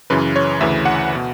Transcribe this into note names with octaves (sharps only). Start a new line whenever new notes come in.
F#2 C#3 E3 B4
C#5
D2 C#3 E3 E5
F#5
B2